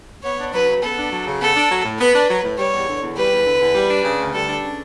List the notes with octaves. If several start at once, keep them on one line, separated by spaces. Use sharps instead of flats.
B3 C#5
D4
F#3 B4
C#3
B3 A4
D4
F#3
C#3
B3 A4
D4
F#3
A2
B3 B4
D4
F#3
A2
G3 C#5
E2
D3
E2
G3 B4
E2
D3
E2
G3
D4
C#3
D2
G3 A4
D4
C#3